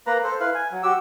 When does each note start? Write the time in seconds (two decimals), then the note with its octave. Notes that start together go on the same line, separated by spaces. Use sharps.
0.07 A#3 B4 A#5
0.24 A4 C5
0.40 E4 B4 F5
0.55 G#5
0.71 F#3
0.83 F#4 G4 E6